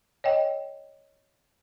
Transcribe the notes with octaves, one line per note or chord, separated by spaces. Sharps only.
C#5 D#5 G5